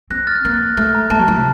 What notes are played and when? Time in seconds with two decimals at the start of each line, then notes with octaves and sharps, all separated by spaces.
0.10 C4 F#6 A#6
0.27 F6 A6
0.35 F#6
0.45 A#3 F6
0.77 A3 F6
0.95 A#5
1.10 A3 A5
1.19 F#3
1.28 F3
1.35 C3